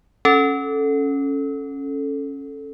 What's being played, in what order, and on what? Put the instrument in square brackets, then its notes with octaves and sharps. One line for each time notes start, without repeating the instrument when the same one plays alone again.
[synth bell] C#4 A4